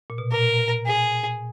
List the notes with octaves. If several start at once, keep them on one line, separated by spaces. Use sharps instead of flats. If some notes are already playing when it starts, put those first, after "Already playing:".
A#2
B2
A#2 A#4
G#4